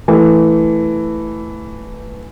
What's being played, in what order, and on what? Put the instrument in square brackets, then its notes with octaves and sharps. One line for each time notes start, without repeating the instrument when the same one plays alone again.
[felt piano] E3 A3